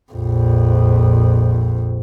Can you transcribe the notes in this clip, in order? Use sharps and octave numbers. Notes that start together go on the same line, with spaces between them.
A#1 F2